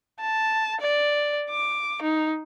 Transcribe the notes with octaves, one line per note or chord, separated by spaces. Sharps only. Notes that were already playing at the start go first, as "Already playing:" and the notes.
A5
D5
D6
D#4